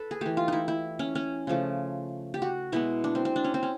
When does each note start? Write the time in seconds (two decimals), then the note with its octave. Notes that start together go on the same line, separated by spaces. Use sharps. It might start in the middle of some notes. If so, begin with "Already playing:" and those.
Already playing: A4 B4
0.11 G#4
0.21 E3 A3 G4
0.37 F4
0.48 D#4 E4
0.68 E4
0.99 C#4
1.15 C#4
1.47 C#3 F3 A3
2.34 G4
2.42 F#4
2.72 B2 G#3 B3 E4
3.04 D4
3.15 C4
3.25 C4
3.36 D4
3.44 C#4
3.54 C4
3.63 C#4